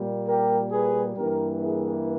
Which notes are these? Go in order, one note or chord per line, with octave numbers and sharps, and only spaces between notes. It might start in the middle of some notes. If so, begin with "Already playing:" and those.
Already playing: A#2 G3 A#3
G4 A#4
G#4 B4
G2 E3 A#3 G4 A#4
E4 G#4